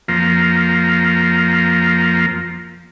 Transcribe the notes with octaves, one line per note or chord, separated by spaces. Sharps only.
F2 F3 A#3